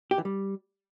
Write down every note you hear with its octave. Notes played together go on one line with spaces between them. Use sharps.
G4
E3
G3